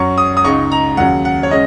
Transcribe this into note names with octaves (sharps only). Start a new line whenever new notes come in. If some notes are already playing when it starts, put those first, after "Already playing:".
Already playing: F#2 F#3 C#4 C#6
D#6
D#6
C#2 C#3 G#3 D#4 C#6
A#5
D#2 C#3 F#3 F#5
F#5
C#5
C#3 G#3 C#4 D#5